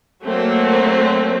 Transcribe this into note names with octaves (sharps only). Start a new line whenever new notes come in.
F#3 A3 A#3 C4